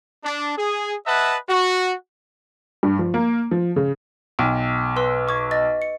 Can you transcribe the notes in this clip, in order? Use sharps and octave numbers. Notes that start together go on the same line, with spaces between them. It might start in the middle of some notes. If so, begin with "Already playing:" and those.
D4
G#4
B4 D#5 E5 F#5 A5
F#4
G2
F3
A#3
F3
C#3
B1 G5
B4 C6 E6
C#6 D6 G#6
D#5 A6
C#7